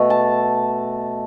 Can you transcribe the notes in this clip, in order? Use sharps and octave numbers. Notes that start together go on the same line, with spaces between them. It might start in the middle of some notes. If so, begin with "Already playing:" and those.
Already playing: B2 A3
A5